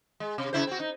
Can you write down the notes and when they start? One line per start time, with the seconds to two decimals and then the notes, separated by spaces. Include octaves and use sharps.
0.20 G#3
0.38 C3
0.53 C#3 E4 C5
0.67 C4 F#4
0.80 D#4